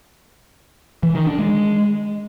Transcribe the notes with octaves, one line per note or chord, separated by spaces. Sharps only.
E3
D#3
D4
G#3